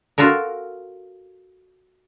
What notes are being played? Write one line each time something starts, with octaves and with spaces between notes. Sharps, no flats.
F4 F#4 A4 A#4